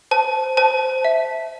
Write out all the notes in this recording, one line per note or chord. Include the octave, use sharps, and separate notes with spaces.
C5 A5
C5 A5
E5